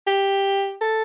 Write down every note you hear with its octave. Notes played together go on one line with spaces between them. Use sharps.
G4
A4